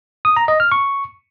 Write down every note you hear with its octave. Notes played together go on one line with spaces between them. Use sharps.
D#6
A#5
D#5
F6
C#6